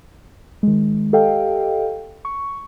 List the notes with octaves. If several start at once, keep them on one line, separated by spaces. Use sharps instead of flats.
D#3 G#3
G4 A4 D#5 F5 G5
C#6